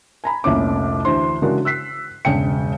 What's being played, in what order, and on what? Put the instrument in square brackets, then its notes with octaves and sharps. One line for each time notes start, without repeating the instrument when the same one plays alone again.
[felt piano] G#5 A#5 B5
F1 C2 A#2 C#4 D6
D2 D3 E3 C5 C6
C#3 E3 G#3 D4 F#4 A#4
E6 F#6 B6 C7
E1 G2 C#3 D4 G5 C#7